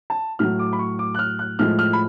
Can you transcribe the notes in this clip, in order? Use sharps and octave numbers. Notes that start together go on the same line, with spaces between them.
A5
A2 F#3 F6
D6
B5
C#6
D6
F#6
F6
F#6
A2 F3 G#3 F6
F6
B5